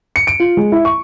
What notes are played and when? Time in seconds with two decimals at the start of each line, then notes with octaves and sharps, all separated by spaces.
0.16 C#7
0.27 D7
0.40 F4
0.57 G#3
0.72 E4
0.85 C#6